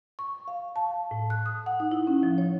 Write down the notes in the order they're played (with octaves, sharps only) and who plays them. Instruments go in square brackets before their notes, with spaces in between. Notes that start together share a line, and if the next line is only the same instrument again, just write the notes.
[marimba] C#6
F5
A5
A2
F#6
D#6
F#5
D#4
E4
C#4
F3
C#5